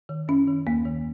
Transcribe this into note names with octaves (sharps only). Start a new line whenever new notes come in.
D#3
F#2 C#4
D#3
D#2 A#3
D#3